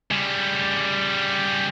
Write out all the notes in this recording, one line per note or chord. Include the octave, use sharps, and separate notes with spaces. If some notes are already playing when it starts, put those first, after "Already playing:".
C#3 G3